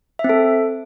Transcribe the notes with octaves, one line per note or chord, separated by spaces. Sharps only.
E5
C4
A4